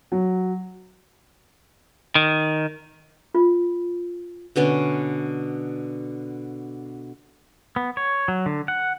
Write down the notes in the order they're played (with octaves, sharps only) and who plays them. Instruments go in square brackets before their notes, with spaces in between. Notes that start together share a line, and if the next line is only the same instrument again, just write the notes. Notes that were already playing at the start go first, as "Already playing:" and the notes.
[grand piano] F#3
[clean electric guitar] D#3
[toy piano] F4
[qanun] B2 D3 B3 C#4
[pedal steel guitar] B3
C#5
F#3
D3
F#5